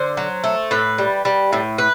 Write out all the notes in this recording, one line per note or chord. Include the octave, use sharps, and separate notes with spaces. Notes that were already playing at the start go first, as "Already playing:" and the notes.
Already playing: D3 C5
F#3
A3
A2 B4
G3
G3
A2
B4